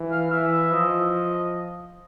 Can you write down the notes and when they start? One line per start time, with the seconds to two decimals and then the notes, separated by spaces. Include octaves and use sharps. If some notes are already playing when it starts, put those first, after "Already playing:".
Already playing: E3
0.11 F5
0.32 E3 E5
0.51 E5
0.72 F3 D#5